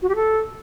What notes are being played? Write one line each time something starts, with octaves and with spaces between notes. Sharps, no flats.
F#4
G4
A4